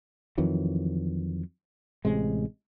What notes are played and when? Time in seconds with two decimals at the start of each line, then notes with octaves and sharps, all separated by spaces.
0.38 F2 D#3 E3 F#3
2.05 A1 C3 G#3